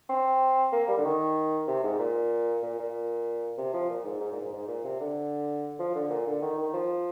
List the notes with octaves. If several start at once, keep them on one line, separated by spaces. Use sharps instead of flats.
C4
A#3
G3
D3
D#3
C3
G#2
A#2
A#2
A#2
C3
F3
A#2
G#2
G#2
A#2
G#2
G#2
A#2
C3
D3
F3
D3
A#2
D3
D#3
D#3
F3